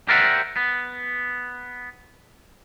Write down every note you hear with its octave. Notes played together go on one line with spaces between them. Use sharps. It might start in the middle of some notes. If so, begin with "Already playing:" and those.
G4 A#4 C5 D5 E5 F#5
B3